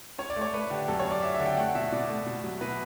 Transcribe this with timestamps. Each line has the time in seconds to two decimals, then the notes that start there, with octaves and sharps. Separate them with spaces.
0.18 C#4 C#5
0.30 D5
0.36 A3
0.41 C#5
0.53 A3 B4
0.70 D3 G4
0.88 F#2 A4
0.99 C#5
1.05 F#2
1.11 D5
1.22 C#4 E5
1.34 E5
1.40 D3
1.46 G5
1.57 A3 F#5
1.75 B2 E5
1.92 B2 D5
2.10 A3
2.26 B2
2.44 F#3
2.61 B2 B4